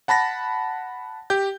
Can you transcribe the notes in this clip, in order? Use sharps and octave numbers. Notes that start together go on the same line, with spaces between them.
F#5 A5 B5 A6 A#6
G4 G6